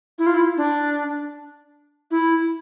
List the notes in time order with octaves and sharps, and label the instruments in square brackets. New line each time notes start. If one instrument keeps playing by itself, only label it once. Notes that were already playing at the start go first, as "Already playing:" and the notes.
[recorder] E4
F4
E4
D4
E4